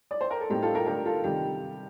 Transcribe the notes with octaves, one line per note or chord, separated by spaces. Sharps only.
D5
C5
A#4
A4
A2 G3 C4 D#4 G4
F4 A4
G4 A#4
D3 A3 D4 G4 A#4
F4 A4
C3 D#3 G3 G4